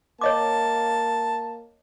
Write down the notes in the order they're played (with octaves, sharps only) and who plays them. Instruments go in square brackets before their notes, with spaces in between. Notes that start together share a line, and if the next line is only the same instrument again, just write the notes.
[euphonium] A#3 [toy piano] C#5 D#5 D6 [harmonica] A5